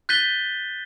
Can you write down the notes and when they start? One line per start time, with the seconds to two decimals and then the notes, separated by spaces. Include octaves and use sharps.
0.09 F#6 G6 A6 B6 D#7 G7